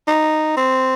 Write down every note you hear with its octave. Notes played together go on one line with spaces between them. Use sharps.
D#4
C4